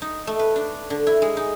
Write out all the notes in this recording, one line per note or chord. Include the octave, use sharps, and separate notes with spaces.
D#4
A3
B4
D4
D3
E4
G#3
D#4